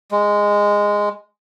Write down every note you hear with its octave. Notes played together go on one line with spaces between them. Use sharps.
G#3